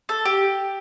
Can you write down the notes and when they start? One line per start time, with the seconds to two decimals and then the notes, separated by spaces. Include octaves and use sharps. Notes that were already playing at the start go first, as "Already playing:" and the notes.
0.09 A4
0.25 G4